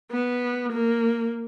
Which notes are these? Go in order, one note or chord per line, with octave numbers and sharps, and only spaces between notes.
B3
A#3